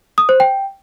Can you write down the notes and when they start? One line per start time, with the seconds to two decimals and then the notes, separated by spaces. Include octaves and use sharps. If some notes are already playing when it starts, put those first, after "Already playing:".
0.18 D#6
0.29 C5
0.40 G5